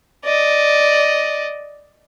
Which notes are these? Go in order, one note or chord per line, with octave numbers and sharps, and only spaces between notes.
D5 D#5